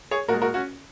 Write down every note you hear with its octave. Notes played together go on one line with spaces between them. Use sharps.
G#4 C#5
A#2 F#4 A#4
G#3
F#4 A#4
C#4 F#4